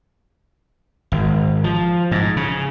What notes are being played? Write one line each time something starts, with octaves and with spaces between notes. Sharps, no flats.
G#1
F3
G#2
C#3